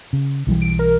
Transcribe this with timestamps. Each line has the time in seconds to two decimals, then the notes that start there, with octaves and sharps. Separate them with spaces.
0.13 C#3
0.47 B1 E3 G3
0.62 D7
0.79 A#4